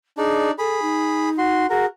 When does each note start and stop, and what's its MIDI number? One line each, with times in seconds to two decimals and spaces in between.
0.18 0.51 62
0.18 0.51 63
0.18 0.49 68
0.18 0.51 74
0.59 1.29 68
0.59 0.81 69
0.59 1.29 83
0.82 1.66 63
1.38 1.66 66
1.38 1.66 84
1.70 1.85 66
1.70 1.86 68
1.70 1.85 70